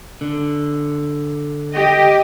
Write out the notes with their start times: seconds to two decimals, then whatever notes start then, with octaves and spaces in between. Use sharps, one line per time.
0.21 D3
1.75 G4 D#5